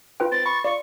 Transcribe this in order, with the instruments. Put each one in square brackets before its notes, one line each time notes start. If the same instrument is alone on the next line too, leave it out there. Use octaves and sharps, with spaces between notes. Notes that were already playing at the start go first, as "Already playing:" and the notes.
[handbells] F4 B4 G5
[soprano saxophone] C4 [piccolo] A6
[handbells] B5 [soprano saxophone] C#6
[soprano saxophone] F4 [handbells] D5 [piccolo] C#6